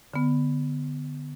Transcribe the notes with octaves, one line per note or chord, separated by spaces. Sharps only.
D3 B3